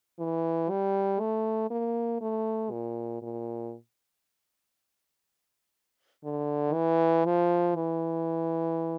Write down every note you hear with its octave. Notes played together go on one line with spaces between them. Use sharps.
E3
G3
A3
A#3
A3
A#2
A#2
D3
E3
F3
E3